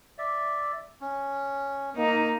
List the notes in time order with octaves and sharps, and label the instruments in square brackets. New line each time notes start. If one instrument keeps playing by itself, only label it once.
[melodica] D5 E5
C#4
[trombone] A#3 [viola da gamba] D#4